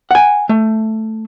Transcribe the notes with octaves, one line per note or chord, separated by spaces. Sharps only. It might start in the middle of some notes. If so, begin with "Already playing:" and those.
F#5 G#5
A3